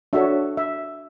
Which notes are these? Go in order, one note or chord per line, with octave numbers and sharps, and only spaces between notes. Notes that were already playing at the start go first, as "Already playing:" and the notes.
D4 F#4 A4 C#5 E5
E5